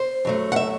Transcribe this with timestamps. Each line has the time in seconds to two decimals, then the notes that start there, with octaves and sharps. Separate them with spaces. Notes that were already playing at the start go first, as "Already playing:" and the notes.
Already playing: C5
0.25 F#2 F#3 A3
0.52 F#5
0.56 E5